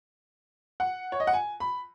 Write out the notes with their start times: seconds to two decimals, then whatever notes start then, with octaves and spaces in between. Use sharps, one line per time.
0.80 F#5
1.12 C#5
1.20 D#5
1.27 F#5
1.33 G#5
1.60 B5